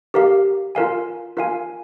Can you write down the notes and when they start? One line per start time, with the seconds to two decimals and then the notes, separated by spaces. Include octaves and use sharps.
0.14 G4 A#4 F5
0.75 F4 A#4 F5 G#5
1.37 F4 A#4 F5 G#5